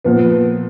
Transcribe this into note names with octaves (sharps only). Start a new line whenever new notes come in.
A#2 F3 B3